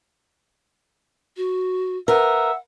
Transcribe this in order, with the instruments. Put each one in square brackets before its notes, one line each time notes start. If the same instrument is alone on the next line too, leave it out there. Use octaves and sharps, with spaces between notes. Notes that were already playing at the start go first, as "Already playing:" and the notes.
[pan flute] F#4
[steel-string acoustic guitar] A#4 B4 [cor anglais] E5 [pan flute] F#5